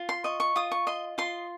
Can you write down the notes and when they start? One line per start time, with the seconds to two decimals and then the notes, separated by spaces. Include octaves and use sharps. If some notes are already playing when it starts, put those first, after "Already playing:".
Already playing: F4
0.09 C6
0.24 D#5 C#6
0.40 C#6
0.56 F4 D#6
0.71 C#6
0.87 D#5 C6
1.18 F4 C6